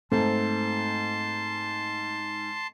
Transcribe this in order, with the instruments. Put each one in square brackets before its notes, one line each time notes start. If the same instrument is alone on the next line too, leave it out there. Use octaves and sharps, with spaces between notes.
[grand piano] G#2 [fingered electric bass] A3 [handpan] C4 A4 [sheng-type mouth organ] A5 C6